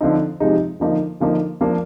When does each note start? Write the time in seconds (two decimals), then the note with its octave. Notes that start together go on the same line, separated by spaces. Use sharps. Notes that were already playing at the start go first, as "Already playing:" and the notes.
0.01 D3 F3 C4 D#4
0.40 C3 F3 G#3 D#4
0.80 D3 F3 A#3 D#4
1.20 D3 F3 A#3 D#4
1.61 F3 A#3 D4